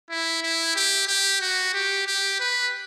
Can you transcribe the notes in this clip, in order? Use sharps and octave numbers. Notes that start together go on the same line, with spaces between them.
E4
E4
G4
G4
F#4
G4
G4
B4